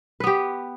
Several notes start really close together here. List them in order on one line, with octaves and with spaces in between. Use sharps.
B4 B3 G4